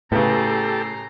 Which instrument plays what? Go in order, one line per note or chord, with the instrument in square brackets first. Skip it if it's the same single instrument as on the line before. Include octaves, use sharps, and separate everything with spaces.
[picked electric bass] A2 [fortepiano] C#3 B3 [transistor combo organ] G4 A4 [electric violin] A#5 C7